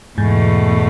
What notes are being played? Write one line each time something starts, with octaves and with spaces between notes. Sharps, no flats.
E2 G#2 B2 A3